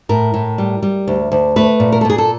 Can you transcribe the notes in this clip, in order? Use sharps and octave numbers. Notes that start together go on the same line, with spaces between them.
A2 A#4
A2
G3
G3
D2
D2
A3 B4
A#2
A#4
A4
A#2 G#4
A4